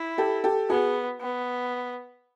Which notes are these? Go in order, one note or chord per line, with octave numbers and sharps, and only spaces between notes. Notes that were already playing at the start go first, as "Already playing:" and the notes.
Already playing: E4
G4 A4
G4 A4
B3 F#4 G#4
B3